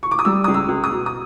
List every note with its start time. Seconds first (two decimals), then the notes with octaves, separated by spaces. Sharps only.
0.03 C#6
0.11 D6
0.19 D#6
0.25 G3 E6
0.44 C#2 D#6
0.54 E6
0.68 C#2
0.84 D#6
0.91 B2
1.06 D#6